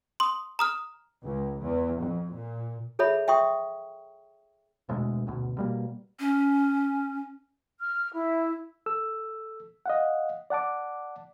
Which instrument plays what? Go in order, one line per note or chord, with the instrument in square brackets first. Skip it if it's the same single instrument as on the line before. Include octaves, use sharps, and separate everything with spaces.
[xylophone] C6 D#6
A#5 D#6 F6
[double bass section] C#2
E2
F2
A#2
[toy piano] G#4 A4 C#5 E5 B5
E5 F5 G5 C6 C#6 D#6
[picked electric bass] E1 D2 B2 G#3
D#1 G#1 D2 B2
B2 G3 A#3
[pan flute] C#4
[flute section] F6
E4
[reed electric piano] A4 E6
D#5 F5 F#5
D5 F#5 A5 D6